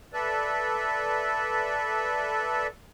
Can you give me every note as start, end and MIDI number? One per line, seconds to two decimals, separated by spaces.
0.13 2.67 69
0.13 2.67 71
0.13 2.67 74
0.13 2.67 76